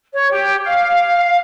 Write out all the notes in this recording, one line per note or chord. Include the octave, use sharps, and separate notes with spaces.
C#5
G4
F5